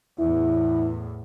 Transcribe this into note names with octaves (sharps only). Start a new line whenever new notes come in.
E2 A2 E4